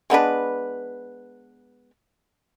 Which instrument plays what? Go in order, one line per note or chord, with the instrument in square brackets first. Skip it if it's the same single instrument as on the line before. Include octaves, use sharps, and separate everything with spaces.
[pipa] G#3 B3 D4 B4